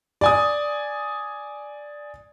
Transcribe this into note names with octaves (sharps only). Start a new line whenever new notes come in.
D5 G#5 D#6